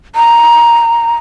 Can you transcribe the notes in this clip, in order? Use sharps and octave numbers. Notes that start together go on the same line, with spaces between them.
A#5